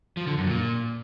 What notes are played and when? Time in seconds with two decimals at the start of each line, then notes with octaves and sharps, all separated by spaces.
0.17 F3
0.27 D3
0.37 F#2
0.47 A#2